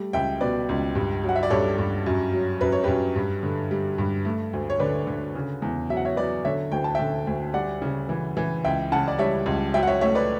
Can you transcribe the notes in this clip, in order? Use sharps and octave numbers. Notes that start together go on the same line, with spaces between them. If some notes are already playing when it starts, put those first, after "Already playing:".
Already playing: G3 A3
C#2 E5 G5
B2 B4 D5
C#2
G2
F#3
F#5
E5
D5
G2 A4 C#5
G2
F#2
F#3
F#2 B4
C#5
F#2 G4 B4
G2
D3
G3
G2
A3
D2
C#5
D3 B4 D5
D3
C#3
E2
F#3 E5
F#5
C#5 E5
F#3 B4 D5
D3 C#5 E5
D2 G5
A5
D3 E5 G5
D2
G3 D5 F#5
C#3
E3
E3
C#2 E5 G5
C#3 F#5 A5
D5
G3 C#5 E5
C#2
F#3 E5 G5
F#5
C#5 E5
A3 C#5 E5
B4 D5